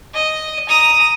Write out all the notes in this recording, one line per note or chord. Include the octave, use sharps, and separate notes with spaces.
D#5
A#5 D#6